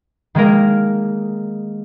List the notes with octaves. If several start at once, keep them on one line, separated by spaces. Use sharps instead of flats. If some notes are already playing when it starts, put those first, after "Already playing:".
D#3 G#3 A#3 A#4